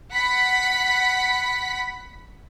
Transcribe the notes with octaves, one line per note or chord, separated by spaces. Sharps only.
F#5 B5 B6